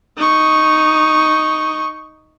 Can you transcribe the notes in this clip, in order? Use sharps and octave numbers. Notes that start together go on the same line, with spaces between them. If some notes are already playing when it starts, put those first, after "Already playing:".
D#4 C#6